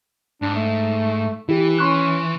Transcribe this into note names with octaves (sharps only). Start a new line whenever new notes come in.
G#2 D4
A3
E3 E4 G4
C#4 C6 C#6 F#6